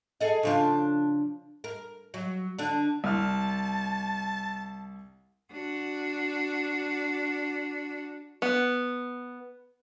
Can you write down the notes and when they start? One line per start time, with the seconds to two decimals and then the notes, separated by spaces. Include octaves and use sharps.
0.21 G#4 A4 D#5
0.43 C#3 F3 D4
1.64 A#4
2.14 F#3
2.58 D3 D4
3.04 C2 A5 F6
5.52 D4 F#4
8.42 B3